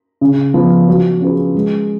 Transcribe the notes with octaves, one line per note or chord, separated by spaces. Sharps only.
C#3
F3 B3
F#3
C#4 F4 G#4 B4
G#3